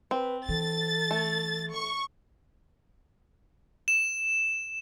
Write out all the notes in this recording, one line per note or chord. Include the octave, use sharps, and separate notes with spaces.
C4 B4
E3 A4 A6
A3
C#6
E7